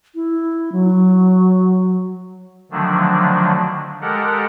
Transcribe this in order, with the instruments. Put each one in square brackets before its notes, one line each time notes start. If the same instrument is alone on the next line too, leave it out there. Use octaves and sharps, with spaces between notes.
[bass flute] E4
F#3
[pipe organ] D3 D#3 F3 F#3 A3 D4
G#3 G4 A4 A#4 F#5